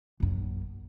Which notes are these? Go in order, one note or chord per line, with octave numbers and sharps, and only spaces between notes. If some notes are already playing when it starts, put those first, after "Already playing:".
A#1 F#2